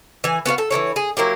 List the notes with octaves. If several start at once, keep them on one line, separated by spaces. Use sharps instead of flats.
E3 G#5
B3 F#4 B4 F5
A4
E3 D#4 E4 C#5
G#4
F#3 A#3 E4 G4